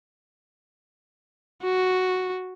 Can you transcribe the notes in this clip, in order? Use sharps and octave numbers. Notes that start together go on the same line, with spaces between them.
F#4